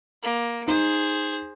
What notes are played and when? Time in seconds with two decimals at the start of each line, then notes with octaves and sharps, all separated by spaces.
0.23 A#3
0.68 D#4 G#4 C5